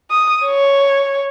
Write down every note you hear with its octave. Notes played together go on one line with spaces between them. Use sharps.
D#6
C#5